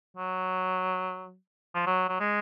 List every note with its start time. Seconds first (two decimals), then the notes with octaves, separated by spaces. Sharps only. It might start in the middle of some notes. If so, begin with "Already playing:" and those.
0.17 F#3
1.75 F3
1.87 F#3
2.09 F#3
2.20 G#3